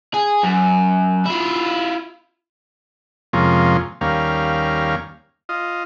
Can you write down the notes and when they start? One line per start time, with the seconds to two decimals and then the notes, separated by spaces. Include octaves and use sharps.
0.14 G#4
0.43 F#2
1.26 E4 F4
3.33 F2 C3 F3 G#3 A#3 C#4
4.01 D#2 G3 A#3 C#4 F5
5.49 F4 D#5